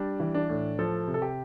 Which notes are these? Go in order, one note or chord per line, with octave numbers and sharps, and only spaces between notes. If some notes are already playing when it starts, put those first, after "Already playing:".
Already playing: G3 D4
E3
D4
A2
F3 A4
C3
A4
G4